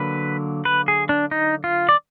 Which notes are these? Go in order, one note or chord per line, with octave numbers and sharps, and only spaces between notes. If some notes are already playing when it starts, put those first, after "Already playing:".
Already playing: D3 F#3 A#3 B4
B4
G#4
D4
D#4
F4
D5